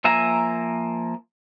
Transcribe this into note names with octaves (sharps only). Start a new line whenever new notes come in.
F3 A#3 E5 G#5 A#5